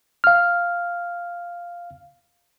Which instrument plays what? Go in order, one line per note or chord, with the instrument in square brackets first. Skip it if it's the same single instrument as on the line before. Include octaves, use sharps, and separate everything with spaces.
[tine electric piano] F5 F6